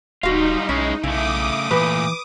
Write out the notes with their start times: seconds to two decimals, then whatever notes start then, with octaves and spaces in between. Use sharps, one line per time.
0.23 D1 G3 D#4 F4 F#4 F5
0.69 B1 G#3 C#4 E4
1.03 B1 C#3 A3 E4 D6 D#6
1.71 A#2 E3 A3 B4